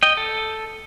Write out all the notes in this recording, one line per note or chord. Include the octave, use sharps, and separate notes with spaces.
D#5 G5
A4